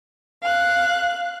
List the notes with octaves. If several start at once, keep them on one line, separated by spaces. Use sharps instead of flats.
F5 F#6